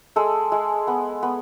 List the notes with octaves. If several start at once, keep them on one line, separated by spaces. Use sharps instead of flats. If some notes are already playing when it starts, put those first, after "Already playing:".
G#3 A4
G#3
B3
B3